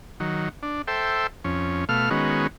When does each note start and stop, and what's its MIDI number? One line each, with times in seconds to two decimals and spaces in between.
0.20 0.49 51
0.20 0.49 54
0.63 0.82 62
0.88 1.27 69
0.88 1.27 72
0.88 1.27 76
0.88 1.27 79
1.44 1.85 41
1.44 1.85 61
1.89 2.10 47
1.89 2.10 57
1.89 2.10 77
1.89 2.10 89
2.10 2.47 51
2.10 2.47 56
2.10 2.47 59
2.10 2.47 61
2.10 2.47 66